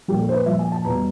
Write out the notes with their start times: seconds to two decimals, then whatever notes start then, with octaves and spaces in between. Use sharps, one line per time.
0.08 A#2 F3 G4
0.21 A4
0.29 C5
0.34 B4
0.46 A#2 F3 E5
0.59 G#5
0.72 A5
0.85 E2 B2 G3 A#5